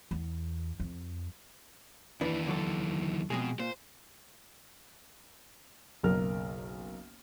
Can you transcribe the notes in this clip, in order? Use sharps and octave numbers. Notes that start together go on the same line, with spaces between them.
E2
F2
D#2 E3 D4 E4 B4
D3 F#3 A4
F2 B2 G#3 G#4
A#2 C5
F#1 B1 A#4 F6